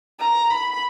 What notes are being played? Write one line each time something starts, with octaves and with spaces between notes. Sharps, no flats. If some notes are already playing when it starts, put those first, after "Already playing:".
A#5
B5